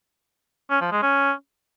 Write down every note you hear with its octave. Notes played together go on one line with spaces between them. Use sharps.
C#4
F3
G#3
C#4